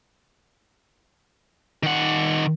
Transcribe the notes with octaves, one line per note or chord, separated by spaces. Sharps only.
D#3 F#5